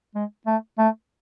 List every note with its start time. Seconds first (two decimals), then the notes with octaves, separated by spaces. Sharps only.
0.15 G#3
0.47 A3
0.78 A3